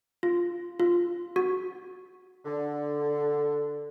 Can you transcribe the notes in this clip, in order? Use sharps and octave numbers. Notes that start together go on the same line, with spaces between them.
F4
F4
F#4
D3